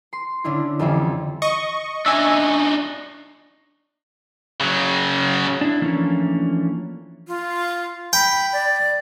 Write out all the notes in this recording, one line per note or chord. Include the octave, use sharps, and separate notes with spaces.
C6
D3 C#4 D4 E4
F2 D3 E3 G3 C4 C#4
D#5 C#6
D4 D#4 E5 G#5
C#3 F#3
D4 E4
E3 F3 A3 A#3 C#4 D4
F4
G5 B5
D5